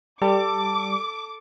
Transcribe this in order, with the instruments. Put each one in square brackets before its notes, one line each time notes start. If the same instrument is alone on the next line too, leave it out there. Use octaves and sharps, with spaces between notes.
[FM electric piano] G3 [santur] A4 [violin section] D6